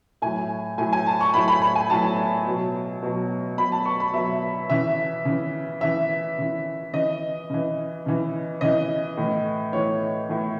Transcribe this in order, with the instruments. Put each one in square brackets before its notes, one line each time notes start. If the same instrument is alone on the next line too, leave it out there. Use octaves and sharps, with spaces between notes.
[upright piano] A2 F#3 G#5
A2 F#3 G#5
G#5
A5
C#6
A2 F#3 B5
B5
B5
G#5
A2 F#3 A5
B2 F#3
B2 F#3
B2 F#3 B5
A5
C#6
B5
B2 F#3 E5
C#3 E3 E5
C#3 E3
C#3 E3 E5
C#3 E3
C#3 E3 D#5
C#3 E3
C#3 E3
C#3 E3 D#5
A2 E3
A2 E3 C#5
A2 E3